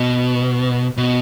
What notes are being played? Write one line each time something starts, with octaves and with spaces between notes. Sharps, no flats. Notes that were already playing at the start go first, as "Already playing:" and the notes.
Already playing: B2
B2